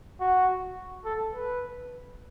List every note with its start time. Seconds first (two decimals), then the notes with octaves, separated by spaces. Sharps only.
0.20 F#4
1.05 A4
1.34 B4